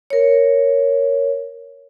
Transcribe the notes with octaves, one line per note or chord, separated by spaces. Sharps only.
A#4 C#5